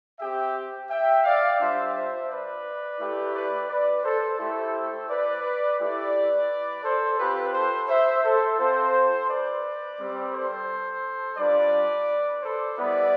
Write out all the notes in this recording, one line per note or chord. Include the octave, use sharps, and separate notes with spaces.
C4 G4 E5 G5
E5 G5
D5 F5
G3 D4 F4 C5 E5
C5 E5
B4 D5
A3 E4 G4
B4 D5
B4 D5
A4 C5
A3 E4 G4 A4 C5
B4 D5
A3 E4 G4 B4 D5
A4 C5
C4 F4 G4 B4
A4 C5
C5 E5
A4 C5
C4 F4 A4 C5
B4 D5
G3 C4 G4
A4 C5
G3 D4 F4 B4 D5
A4 C5
G3 B3 E4 B4 D5